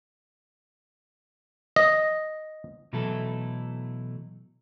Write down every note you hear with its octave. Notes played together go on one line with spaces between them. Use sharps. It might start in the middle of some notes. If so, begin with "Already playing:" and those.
D#5
B2 E3 F#3 A3 E4 A4